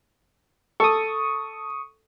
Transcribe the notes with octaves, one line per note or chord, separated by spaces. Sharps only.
A4 C#6 D#6